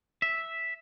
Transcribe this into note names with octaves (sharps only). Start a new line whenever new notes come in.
E5